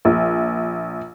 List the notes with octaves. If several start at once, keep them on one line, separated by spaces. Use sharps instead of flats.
A#1